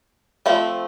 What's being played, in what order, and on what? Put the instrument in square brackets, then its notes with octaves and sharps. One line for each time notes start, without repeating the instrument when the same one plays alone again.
[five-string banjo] F3 A3 C4